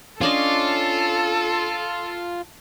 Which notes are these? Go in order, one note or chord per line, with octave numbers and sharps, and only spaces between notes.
C#4 D4 F4 A4 D#5